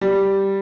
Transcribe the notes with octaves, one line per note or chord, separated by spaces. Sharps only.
G3